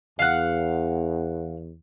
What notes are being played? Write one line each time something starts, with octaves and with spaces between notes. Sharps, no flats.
E2 F5 F#5